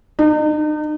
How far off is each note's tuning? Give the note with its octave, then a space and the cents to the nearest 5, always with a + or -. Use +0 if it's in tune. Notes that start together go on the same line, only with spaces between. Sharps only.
D#4 -40